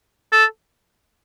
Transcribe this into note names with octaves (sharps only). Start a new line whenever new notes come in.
A4